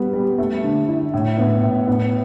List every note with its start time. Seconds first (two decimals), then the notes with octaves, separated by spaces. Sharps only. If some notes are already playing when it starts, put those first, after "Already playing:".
Already playing: G3 B3
0.13 G3
0.38 A3
0.64 D3
0.88 E4
1.14 A2
1.38 B3
1.63 A2
1.88 B3